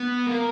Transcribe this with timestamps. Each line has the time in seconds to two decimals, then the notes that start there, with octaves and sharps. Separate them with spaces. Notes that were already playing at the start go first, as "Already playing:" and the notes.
Already playing: B3
0.27 A#3